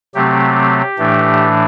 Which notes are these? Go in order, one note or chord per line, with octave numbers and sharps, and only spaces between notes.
C3 F#3 A3 C4 G4
A2 E3 A3 D4